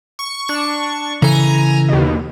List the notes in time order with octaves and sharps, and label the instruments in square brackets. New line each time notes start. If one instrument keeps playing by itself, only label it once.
[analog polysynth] C#6
D4 C#6
[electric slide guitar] C#3 E3 A4 [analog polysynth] G#5 A#5
[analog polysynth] D#2 B2